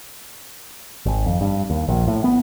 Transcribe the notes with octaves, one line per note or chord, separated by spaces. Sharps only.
G#1
F2
G2
D#2
A#1
A2
B3